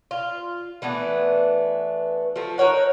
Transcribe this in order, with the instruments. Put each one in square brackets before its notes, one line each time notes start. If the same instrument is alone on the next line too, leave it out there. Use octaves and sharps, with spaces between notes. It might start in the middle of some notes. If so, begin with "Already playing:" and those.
[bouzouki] F4
E3 A3 B3 D4
F3 A3
D#4 A#4 C#5 F#5